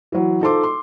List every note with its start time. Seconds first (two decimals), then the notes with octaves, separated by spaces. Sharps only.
0.12 E3 F#3
0.41 D#4 F4 A4 C5 C6 D6
0.63 C6